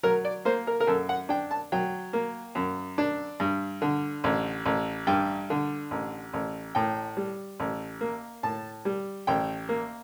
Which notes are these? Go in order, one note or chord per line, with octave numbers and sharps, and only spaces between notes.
F#3 A#4
D5
A#3 C5
A#4
A#4
F#2 A4
F#5
D4 G5
A5
F#3 G5
A#3
F#2
D4
G2
D3
A1
A1
G2 G5
D3
A1
A1
A2 G5
G3
A1
A#3
A2 A5
G3
A1 G5
A#3